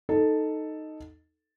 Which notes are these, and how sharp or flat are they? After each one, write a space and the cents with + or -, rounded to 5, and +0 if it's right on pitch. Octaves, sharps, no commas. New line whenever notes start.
D#4 +0 A4 +0